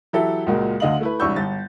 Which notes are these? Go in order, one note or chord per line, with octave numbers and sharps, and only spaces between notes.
E3 F#3 E4 G4 A4 E5
C#2 A#2 G#3 A#3 F#4
D2 D3 D#5 F5 F#7
A3 E4 B4
E1 C2 D4 C#6 E6 G6
G1 A6